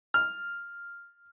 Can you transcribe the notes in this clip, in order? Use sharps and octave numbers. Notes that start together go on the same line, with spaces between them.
F6